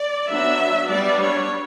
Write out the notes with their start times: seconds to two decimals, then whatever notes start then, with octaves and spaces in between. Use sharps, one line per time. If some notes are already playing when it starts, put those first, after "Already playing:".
Already playing: D5
0.29 F#3 B3 D4 E5
0.90 G3 B3 D4 D5
1.20 C#5